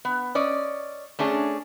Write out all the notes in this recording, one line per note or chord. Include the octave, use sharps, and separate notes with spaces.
B3
C#4 D5 D#5
A3 C#4 D4 G#4